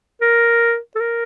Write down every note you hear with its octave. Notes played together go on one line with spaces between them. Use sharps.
A#4
A4
A#4